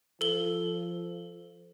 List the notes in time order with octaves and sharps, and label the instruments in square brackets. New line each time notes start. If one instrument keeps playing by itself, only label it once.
[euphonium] F3 [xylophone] A4 G7